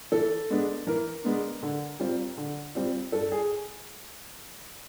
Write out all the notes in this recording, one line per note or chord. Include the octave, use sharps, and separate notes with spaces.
E3 A4
G#3 B3 D4
E3 A#4
G#3 B3 D4
D3
G3 C4 F4
D3
G3 C4 F4
G2 A4
G#4